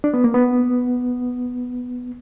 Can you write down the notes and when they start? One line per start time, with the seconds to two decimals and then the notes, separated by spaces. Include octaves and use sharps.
0.04 D4
0.14 B3
0.24 A#3
0.34 B3